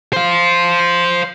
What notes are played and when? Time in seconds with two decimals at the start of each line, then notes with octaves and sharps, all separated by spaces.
0.13 C5 F5